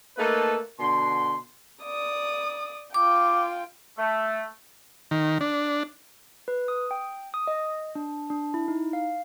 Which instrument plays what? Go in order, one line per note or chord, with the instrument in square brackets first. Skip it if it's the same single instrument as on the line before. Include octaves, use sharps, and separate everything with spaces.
[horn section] A3 A#3 D#4 A4 B4
B2 D3 C6
[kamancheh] D5 D#6
[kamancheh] F4 G5 [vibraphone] D6
[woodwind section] A3
[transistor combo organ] D#3
D4
[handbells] B4
D#6
G5
D#6
D#5
D4
D4
E4
D#4
F5